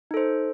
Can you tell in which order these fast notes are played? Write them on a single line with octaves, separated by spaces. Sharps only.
D#4 A4 C5